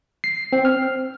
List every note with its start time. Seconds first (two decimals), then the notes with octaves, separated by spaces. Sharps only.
0.24 C7
0.52 C4
0.65 F6